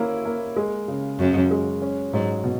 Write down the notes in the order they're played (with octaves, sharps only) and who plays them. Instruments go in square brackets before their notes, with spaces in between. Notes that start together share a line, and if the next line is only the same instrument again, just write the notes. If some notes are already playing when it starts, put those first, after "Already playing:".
Already playing: [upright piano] A#3 C#4 E4
A#3
G#3
C#3
[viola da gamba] F#2 [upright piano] F#4
[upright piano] G#3
C#4
[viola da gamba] G#2 [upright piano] F#3
[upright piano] B2